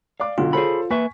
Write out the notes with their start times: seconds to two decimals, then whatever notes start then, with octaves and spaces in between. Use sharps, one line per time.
0.20 D5 F5 D6
0.38 B1 D3 F#3 F4
0.53 G#4 A4 C5 C#5 B5
0.90 A#3 B4 E5 G#5 C#6 B6